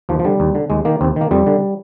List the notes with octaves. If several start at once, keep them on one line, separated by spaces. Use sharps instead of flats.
D#2 F3
F3
D3 G3
D#2
D3
D#2 G#3
D#3 A#3
D#2 C4
D#3 A#3
F2 G3
D3